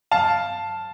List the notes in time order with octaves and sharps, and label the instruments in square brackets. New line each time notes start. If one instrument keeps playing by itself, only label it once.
[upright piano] F5 A5